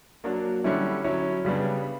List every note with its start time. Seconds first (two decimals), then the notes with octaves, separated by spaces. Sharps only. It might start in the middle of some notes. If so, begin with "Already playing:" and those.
0.24 F#3 A#3 D4 F#4
0.64 D3 G3 C#4 E4
1.04 F#3 C#4 E4
1.45 C#3 G3 B3 D4